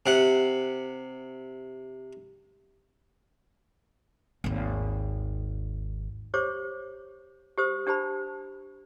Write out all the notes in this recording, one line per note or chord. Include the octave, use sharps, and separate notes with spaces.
C3 F#5
G#1 D#2
G4 C5 C#5 D6
G4 C5 D#6
D4 G4 C5 A5 B5